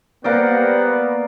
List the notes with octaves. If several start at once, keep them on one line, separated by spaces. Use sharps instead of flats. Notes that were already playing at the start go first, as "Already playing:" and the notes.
G3 A#3 B3 A#4 C5 D5 F#5